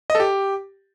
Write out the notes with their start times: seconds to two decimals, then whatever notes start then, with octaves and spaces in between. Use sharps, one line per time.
0.10 D#5
0.15 A4
0.20 G4